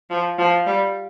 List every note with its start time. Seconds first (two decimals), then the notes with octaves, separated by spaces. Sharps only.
0.10 F3
0.38 F3
0.66 G3